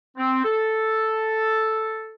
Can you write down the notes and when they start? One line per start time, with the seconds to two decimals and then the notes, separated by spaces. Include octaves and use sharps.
0.17 C4
0.44 A4